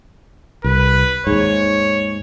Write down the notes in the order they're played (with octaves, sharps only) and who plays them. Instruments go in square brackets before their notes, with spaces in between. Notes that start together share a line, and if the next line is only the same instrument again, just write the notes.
[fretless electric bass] C2 [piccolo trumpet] B4
[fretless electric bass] D#2 G#2 [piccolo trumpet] C#5